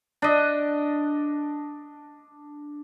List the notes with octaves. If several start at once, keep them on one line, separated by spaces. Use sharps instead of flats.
D4 D#5